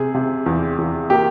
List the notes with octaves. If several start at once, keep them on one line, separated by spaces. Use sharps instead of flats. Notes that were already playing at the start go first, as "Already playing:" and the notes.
Already playing: C3 G#4
C3
E2
E2
A#3 G4